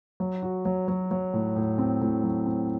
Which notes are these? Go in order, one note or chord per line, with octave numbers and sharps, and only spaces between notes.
F#3
F#4
F#3
F#3
F#3
A2
A2
C4
A2
F#3
C4